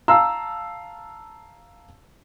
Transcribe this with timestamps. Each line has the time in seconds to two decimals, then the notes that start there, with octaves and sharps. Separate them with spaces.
0.08 F5 A5 A#5 E6